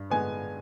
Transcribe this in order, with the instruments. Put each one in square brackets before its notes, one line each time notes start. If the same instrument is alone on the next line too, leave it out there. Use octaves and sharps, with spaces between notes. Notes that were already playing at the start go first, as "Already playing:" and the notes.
Already playing: [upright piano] G2
D3 G#3 B3 G#5